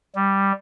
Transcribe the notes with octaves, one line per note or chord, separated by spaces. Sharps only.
G3